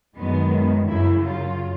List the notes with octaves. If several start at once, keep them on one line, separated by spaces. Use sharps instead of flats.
F#2 D#3 G#3 B3
F#2 C#3 F#3 E4
F4